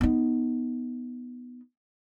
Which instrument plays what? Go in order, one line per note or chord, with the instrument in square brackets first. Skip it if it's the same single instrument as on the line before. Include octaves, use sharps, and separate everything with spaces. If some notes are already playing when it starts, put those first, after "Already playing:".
[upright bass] B3 D#4